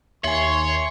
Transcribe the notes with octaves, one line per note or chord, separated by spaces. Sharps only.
D#2 C#5 E5 G#5 C6